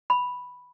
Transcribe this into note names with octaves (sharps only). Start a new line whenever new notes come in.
B5